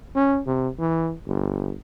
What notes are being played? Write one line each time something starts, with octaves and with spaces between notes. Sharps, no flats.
C#4
C3
E3
G1